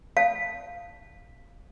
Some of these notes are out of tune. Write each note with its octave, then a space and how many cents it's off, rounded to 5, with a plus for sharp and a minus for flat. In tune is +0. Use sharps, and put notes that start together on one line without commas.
F5 +0 A5 +0